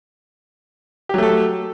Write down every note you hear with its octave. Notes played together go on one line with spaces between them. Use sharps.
F#3 A3 G4 A4